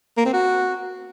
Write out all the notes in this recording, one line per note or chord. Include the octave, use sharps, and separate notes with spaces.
A#3
C4
F#4